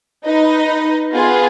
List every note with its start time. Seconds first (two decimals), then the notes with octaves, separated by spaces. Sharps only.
0.25 D#4 B4 D#5
1.13 B3 F4 G#4